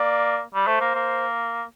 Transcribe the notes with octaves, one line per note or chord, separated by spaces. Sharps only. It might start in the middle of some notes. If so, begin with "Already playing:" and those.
Already playing: A#3 D5
G3
A3 C5
A#3
A#3